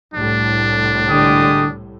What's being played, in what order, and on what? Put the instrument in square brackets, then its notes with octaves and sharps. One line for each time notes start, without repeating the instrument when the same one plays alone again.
[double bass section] C2 A2 [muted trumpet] D4
[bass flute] D3 [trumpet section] G#3 G4 D#6